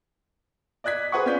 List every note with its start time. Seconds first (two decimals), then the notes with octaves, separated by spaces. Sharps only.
0.84 D5 D#5 F#6 G#6 B6
1.12 G#4 B4 C5 F#5 G#5 C#6
1.26 C#4 F4 D5 G6 B6